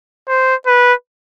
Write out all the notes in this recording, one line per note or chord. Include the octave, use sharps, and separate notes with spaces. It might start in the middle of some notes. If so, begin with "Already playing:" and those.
C5
B4